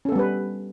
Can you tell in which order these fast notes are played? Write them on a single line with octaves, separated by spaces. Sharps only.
C#4 A4 B3 G3 B4